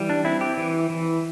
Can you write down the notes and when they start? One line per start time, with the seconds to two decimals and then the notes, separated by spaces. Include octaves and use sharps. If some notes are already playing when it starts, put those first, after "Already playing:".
Already playing: E3 G3
0.09 D4
0.25 C4 E4
0.41 G4
0.57 E3
0.90 E3